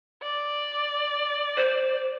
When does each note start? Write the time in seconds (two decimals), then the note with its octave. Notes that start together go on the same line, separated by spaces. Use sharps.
0.23 D5
1.57 C5